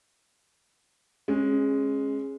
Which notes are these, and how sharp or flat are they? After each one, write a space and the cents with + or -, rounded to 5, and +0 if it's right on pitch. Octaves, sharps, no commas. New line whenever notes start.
G#3 +0 C#4 -25